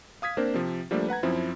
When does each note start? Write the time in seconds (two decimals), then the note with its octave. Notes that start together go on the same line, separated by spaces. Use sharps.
0.22 F5 D#6 G#6 B6
0.37 A#3 C4 D4 A#4 C5
0.54 C3 F3
0.91 F3 G3 A3 A#3 D4 A4
1.09 B4 F#5 A#5 G#6
1.23 F#2 F3 C4 E4